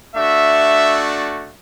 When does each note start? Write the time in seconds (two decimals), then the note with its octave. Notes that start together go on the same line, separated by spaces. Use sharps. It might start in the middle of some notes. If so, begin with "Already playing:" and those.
0.15 A3 D4 F#4 E5